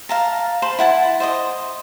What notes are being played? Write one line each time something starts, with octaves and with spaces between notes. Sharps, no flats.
F5 A5 A#5
C5 A5 B5 C6
E4 F#5 A5
C5 D#5 D#6